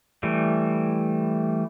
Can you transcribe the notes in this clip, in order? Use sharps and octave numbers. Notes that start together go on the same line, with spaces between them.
E3 G3 A3